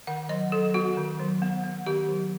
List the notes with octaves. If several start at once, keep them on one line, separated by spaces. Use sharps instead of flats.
D#3 F#5
F#3 D#5
F#3 A4
B3 F#4
D#3
F#3
B3
B3
D#3 G4
F#3